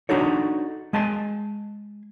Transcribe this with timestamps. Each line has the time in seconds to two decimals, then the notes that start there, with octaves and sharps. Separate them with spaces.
0.09 D4 D#4 F#4 A4 C#5
0.93 G#3 G#5 A5 C6